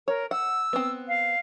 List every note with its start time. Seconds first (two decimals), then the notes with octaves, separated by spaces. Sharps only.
0.08 A#4 C#5
0.31 F#5 E6
0.73 B3 C4
1.08 F5